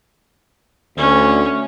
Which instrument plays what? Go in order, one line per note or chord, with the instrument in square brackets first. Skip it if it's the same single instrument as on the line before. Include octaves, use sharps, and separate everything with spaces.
[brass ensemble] D2 [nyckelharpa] C#4